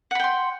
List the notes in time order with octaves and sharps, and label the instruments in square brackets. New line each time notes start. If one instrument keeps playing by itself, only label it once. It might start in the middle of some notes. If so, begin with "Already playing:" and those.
[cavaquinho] F#5
B5
G5
C6